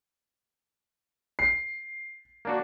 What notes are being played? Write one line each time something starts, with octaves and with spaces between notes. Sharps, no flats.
C7
A#3 D4 F#4